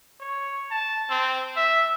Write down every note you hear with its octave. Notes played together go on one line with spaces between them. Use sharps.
C#5
A5
C4
E5